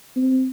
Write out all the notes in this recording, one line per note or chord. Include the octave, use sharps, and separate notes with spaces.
C4